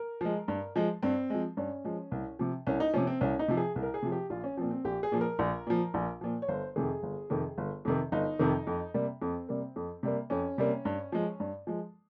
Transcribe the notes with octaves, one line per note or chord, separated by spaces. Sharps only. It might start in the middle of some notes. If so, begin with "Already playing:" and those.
Already playing: A#4
F3 G#3
G2
F3 G#3
G2 C4
F3 G#3
G2 C#4
F3 G#3
C2
C3 F3
C2 C#4
D#4
C3 F3 C#4
C4
C2 C#4
D#4
C3 F3
G#4
C2
A#4
G#4
C3 F3
G4
A#1 F4
C#4
A#2 F3 C4
C4
A#1 G4
G#4
A#2 F3
A#4
A#1
A#2 F3
A#1
A#2 F3
C#5
G1 C5
F2 C3 D#3 G#4
G1
F2 C3 D#3
G1
F2 C3 D#3
G1 D#4
F2 C3 D#3
F2
C3 G3 A#3
F2 C4
C3 G3 A#3
F2
C3 G3 A#3
F2 C#4
C3 G3 A#3
G2
F3 G#3
G2
F3 G#3